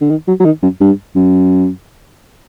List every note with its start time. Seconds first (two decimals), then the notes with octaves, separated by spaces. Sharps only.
0.01 D3
0.10 D#3
0.28 F#3
0.40 F#3
0.45 D#3
0.63 F#2
0.80 G2
1.16 F#2